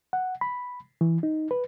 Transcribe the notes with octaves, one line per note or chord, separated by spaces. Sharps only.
F#5
B5
E3
D#4
B4